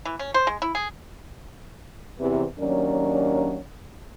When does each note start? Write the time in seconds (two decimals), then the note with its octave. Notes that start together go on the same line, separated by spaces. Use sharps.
0.05 E3
0.19 C#4
0.34 C5
0.47 G#3
0.62 E4
0.75 G#4
2.19 E2 C3 E3
2.58 D#2 F#3 C#4 D4 A#4 D5